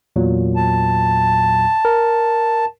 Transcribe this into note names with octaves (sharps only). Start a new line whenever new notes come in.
E2 A#2 F#3
A5
A#4